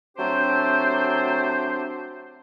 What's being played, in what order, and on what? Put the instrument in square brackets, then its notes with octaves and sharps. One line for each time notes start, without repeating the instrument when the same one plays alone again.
[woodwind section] F#3 A3 C4 D4 G4 C5